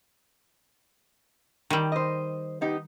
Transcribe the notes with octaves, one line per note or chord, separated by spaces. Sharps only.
D#3 G3
C5 D#5
B3 D#4 G4